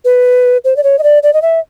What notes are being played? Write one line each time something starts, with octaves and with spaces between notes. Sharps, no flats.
B4
C5
D5
C#5
D#5
D5
D5
D#5
E5